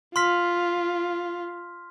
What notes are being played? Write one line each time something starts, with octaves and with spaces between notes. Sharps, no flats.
F4 C6 F6 B6